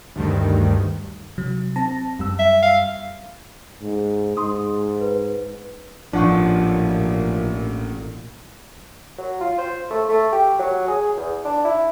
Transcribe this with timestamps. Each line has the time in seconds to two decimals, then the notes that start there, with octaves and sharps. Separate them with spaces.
0.16 D2 G2 D#3
1.38 C3 F#3
1.76 C4 A5 A#6
2.19 F#2 G3 E6
2.39 E5
2.63 F5
3.82 G#2
4.37 G#2 C6 D#6
5.01 B4
6.13 A1 A#2 F3 D4 D#4 F#5 C#6
9.18 F#3
9.41 F4
9.58 C5
9.90 A3
10.09 A3
10.33 G4
10.59 F#3
10.88 G#4
11.17 E2
11.45 D4
11.65 E4